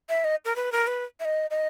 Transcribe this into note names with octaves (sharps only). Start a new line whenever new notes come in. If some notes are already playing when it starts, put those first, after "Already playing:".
E5
D#5
A#4
B4
A#4
B4
E5
D#5
D#5